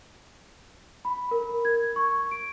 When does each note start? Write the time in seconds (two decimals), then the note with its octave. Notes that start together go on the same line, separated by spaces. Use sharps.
1.05 B5
1.31 A#4
1.65 G#6
1.96 C#6
2.31 D7